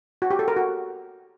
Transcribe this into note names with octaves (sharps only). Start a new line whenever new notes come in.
F#4
G4
A4
A#4
F#4